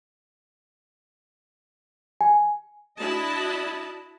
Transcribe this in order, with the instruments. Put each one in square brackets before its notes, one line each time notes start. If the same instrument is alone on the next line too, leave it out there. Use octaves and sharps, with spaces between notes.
[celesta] G#5
[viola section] D4 E4 F#4 D#5 A5 B5